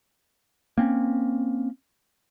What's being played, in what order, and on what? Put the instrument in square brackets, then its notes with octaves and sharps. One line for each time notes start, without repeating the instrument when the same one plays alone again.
[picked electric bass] A#3 C4 C#4